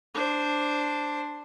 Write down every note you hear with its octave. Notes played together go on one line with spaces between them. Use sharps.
D4 C5